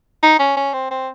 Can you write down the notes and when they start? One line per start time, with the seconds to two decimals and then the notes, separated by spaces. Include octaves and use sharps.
0.23 D#4
0.39 C#4
0.56 C#4
0.73 C4
0.91 C4